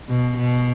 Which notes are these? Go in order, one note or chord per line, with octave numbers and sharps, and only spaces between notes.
B2
B2